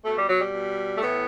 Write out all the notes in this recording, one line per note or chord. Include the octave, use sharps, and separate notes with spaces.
B2 A3
G3
F#3
G3
B2
A3
A2 E3 B3